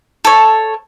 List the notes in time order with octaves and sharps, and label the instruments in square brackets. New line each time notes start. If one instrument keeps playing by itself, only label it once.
[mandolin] A4 C#5